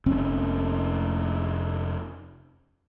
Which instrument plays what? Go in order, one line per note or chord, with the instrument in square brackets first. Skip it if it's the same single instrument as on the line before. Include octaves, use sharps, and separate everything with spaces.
[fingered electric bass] F1 C4 C#4